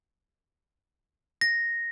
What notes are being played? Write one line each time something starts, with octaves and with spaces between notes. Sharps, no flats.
A#6